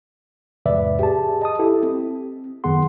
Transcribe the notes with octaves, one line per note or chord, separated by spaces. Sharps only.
E2 G#2 C3 B4 D5 E5
G4 G#4 A5
D#5 A5 D#6
E4 G4 A4
C4
F#2 D#3 B3 G#4 F#5 C6